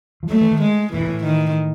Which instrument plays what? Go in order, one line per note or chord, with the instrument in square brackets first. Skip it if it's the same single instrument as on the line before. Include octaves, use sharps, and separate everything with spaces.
[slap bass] F3
[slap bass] F#3 [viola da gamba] A3
[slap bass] E3
D#3
[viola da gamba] G#3
[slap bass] A2 [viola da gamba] E3
[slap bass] A#2
A2
[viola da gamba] D#3